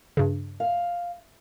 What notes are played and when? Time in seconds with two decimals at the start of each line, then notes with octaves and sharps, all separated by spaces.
0.17 G2 C#3
0.60 F5